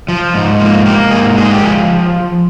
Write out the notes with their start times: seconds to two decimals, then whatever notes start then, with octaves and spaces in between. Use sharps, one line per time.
0.08 F3
0.34 G#2
0.60 A#3
0.86 A#3 G4
1.11 G#2 G#4
1.37 G#3 G#4
1.51 G4
1.63 F3 G#4